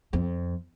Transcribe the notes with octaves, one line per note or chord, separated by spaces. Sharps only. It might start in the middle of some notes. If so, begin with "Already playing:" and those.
F2